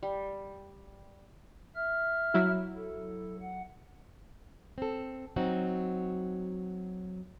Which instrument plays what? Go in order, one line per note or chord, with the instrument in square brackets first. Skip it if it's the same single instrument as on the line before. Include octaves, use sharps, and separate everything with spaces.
[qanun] G3
[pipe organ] E5 F6
[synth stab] F#3 E4
[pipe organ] A4
F#5
[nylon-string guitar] C4 A4
F#3 C4 D#4 F#4